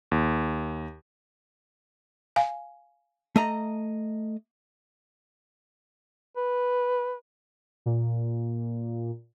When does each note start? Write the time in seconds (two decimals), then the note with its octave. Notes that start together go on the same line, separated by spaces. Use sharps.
0.11 D#2
2.36 F5 G#5
3.36 A3 D#5 A5 A#5
6.37 B4
7.86 A#2